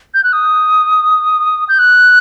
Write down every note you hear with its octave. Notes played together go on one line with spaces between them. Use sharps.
G6
F#6
D#6
G6
F#6